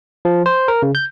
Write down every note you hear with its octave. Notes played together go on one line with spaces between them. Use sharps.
F3
C5
A#4
C#3
G6